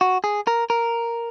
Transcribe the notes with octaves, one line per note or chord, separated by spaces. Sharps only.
F#4
G#4
A#4
A#4